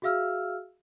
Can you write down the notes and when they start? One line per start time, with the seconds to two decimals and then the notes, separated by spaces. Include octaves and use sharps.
0.02 F#4 G#4 E5 F5 E6 F6